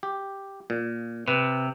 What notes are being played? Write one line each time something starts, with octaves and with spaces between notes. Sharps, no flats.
G4
A#2
C3 B4